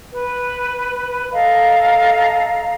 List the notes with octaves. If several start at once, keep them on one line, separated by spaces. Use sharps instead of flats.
B4
A4 D#5 F5 A#5